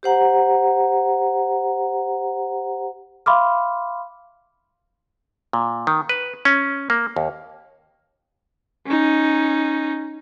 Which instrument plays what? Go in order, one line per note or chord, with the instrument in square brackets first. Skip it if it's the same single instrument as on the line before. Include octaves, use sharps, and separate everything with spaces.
[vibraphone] G4 C5 F#5 A#5
[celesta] E5 F5 B5 C6 D6 F6
[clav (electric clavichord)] A#2
D#3
B4
C#4
A#3
D#2
[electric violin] C#4 D#4